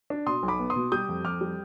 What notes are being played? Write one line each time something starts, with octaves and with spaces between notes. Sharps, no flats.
D4
B2 C6 D#6
B1
B5 D6
B3
C6 D#6
B2
G3 D#6 G6
F2
F2 D6 F6
G3